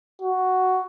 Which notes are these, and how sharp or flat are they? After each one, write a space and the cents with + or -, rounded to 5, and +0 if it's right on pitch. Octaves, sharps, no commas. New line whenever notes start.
F#4 +5